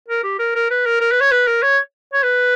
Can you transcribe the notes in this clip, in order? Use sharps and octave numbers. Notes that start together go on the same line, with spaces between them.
A#4
G4
A#4
A#4
B4
A#4
A#4
B4
C#5
B4
A#4
C#5
C#5
B4